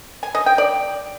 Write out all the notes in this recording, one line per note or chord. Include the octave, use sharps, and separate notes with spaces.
G#5
D#5
G5
D5